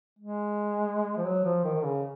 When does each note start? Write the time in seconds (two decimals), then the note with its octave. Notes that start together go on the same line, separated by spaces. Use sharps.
0.19 G#3
1.17 F3
1.24 F#3
1.45 F3
1.64 D#3
1.75 D#3
1.85 C#3